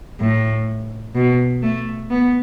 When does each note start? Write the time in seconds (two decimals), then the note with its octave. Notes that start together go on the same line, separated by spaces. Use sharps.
0.20 A2
1.15 B2
1.62 A3
2.10 B3